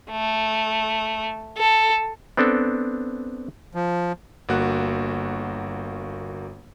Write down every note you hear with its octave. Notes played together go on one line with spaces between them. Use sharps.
A3
A4
B3 C4 D4 A4
F3
G1 A#3 F#4 F#6